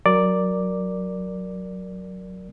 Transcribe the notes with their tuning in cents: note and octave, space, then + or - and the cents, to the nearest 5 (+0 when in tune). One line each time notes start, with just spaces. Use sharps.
F#3 +0 A#4 +0 D5 +0